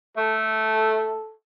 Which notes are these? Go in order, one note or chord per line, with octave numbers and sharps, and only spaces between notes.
A3 A4